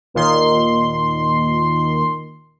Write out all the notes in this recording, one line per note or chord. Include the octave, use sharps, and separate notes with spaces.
D#2 A#2 D#3 C6